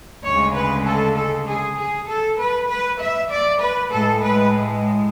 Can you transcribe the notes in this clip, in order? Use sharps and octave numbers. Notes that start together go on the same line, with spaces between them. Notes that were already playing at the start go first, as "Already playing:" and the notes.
D2 C#3 G#3 C#5
B4
A4
A4
G#4
G#4
A4
B4
B4
E5
D5
B4
A2 G#3 A4
B4